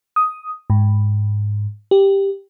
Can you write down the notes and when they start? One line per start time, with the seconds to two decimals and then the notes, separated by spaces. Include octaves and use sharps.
0.16 D#6
0.70 G#2
1.91 G4